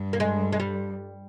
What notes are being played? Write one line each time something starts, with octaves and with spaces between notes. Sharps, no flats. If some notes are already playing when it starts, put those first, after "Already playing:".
Already playing: G2
A#3
G#3
G#3
G3